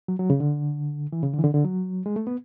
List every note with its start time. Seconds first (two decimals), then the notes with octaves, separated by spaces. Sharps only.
0.08 F#3
0.19 F#3
0.30 C#3
0.40 D3
1.12 E3
1.23 C#3
1.34 D3
1.39 E3
1.44 D3
1.54 D3
1.65 F#3
2.06 G#3
2.16 A3
2.27 B3